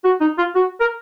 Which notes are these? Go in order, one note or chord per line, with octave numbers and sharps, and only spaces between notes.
F#4
D#4
F4
F#4
A#4